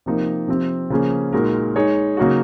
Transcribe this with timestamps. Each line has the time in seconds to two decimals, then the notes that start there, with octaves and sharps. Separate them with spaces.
0.06 C3 F3 A#3 D#4 A#4
0.48 C3 F3 C4
0.90 C#3 F3 A#3 C#4 G#4
1.33 A#2 G#3 D#4 F#4 A#4
1.76 G#3 D#4 G#4 C#5
2.17 C#3 F#3 A#3 D#4 F#4